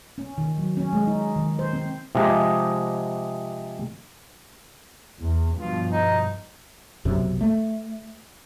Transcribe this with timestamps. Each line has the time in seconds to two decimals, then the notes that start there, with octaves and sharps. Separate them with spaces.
0.18 C#4
0.38 D#3
0.58 F#3
0.77 C#4
0.93 G#3
1.07 D#4
1.36 D#3
1.59 C5
1.73 C4
2.15 C3 F3 G#3 D#4 G4
5.20 E2
5.56 G2 B2 F3 F4
5.89 D#4
7.05 B1 F#2 C3
7.41 A3